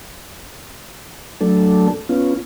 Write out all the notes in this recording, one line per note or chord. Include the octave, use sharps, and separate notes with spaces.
F#3 A3 D4 A4
B3 C#4 F4